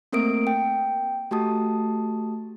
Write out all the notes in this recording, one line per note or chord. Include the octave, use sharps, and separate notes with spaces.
A3 A#3 C4 A#4 D#6 D7
G5
A3 F#4 G4 A5 D#6